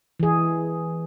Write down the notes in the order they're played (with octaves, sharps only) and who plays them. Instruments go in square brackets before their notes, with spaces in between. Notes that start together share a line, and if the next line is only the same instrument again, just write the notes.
[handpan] E3 G#4